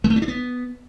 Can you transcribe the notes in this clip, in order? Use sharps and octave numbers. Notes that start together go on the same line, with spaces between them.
G#3
A3
C#4
D4
B3